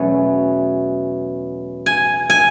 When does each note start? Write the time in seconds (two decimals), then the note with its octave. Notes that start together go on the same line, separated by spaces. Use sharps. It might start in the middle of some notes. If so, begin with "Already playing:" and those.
Already playing: E2 B2 F#3 A3 C#4
1.86 G#5
2.30 G#5